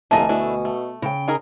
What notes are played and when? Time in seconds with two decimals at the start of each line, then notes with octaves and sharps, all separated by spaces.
0.11 F1 D2 A#3 E4 D#5 G#5 A5
0.29 B2 A3 D4 E4
0.65 A3
1.02 C#3 G5
1.28 D#4 G#4 A#4